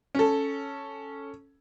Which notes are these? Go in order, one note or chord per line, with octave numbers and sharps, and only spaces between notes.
C#4 A4